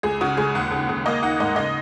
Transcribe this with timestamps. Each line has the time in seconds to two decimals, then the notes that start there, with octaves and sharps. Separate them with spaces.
0.03 C#2 G#4
0.21 C#3 F#4
0.37 C#2 G#4
0.55 D#2 F#5
0.71 C#3
0.89 C#3
1.06 A#3 D#5
1.22 D#3 F#5
1.40 G#2 D#5
1.56 C#3 D#5